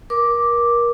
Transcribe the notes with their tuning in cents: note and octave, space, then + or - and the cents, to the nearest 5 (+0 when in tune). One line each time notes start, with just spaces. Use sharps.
A#4 +30 D6 +0